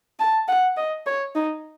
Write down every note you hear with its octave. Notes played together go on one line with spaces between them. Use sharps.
A5
F#5
D#5
C#5
D#4